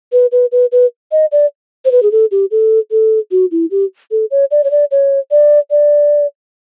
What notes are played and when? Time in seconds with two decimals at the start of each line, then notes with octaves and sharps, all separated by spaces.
0.12 B4
0.32 B4
0.52 B4
0.72 B4
1.12 D#5
1.32 D5
1.85 C5
1.91 B4
2.03 G#4
2.11 A4
2.31 G4
2.51 A4
2.91 A4
3.31 F#4
3.51 E4
3.71 G4
4.11 A4
4.31 C#5
4.51 D5
4.64 C#5
4.71 D5
4.91 C#5
5.31 D5
5.71 D5